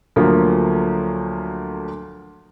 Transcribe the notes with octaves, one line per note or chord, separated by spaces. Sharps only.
D2 D3 F3 F#3 A#3